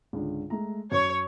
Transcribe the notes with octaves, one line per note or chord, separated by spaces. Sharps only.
C#2 G#2 D3
G#3 A3 A#5
F#2 C#5